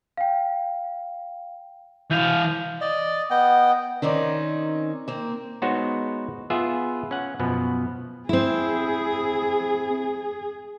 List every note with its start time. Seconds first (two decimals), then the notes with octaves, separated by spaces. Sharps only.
0.17 F5 G5
2.11 E3 F5 G6 D#7 F7
2.81 D5 D#5
3.30 B3 D#5 G5
4.02 D#3 C4 C#4 D#4 D5
5.08 A#3 C4
5.62 G#3 B3 D#4 F#4 C5 C#5
6.50 B3 F4 G#4 E5
7.11 C#4 F#5
7.39 F#2 B2 F3 B3
8.29 C4 E4 G#4